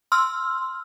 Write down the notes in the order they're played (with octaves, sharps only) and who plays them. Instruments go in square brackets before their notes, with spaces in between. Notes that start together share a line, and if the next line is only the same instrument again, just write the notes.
[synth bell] C6 E6 F6